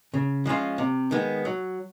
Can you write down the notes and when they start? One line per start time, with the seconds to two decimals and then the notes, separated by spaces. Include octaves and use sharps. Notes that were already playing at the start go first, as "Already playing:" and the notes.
0.14 C#3
0.46 F3 G#3 C#4 F4
0.78 C3
1.11 D#3 G#3 B3
1.45 F#3